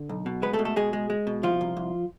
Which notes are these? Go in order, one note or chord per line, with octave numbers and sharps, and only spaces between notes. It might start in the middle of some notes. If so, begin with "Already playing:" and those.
Already playing: D3
B1
B2
G#3 B3 B4
A3 A4
B2
A3 A4
B2 G#3 G#4
G#3
G#3
B2
C2 F3 F4
C2
C2